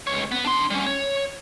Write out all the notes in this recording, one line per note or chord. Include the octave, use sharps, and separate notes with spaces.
C#2 C#5
B3
D4 C6
G3 C#4
C#5